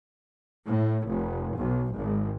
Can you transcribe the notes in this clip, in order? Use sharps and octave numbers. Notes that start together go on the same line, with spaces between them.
A2
F1
B1
G#1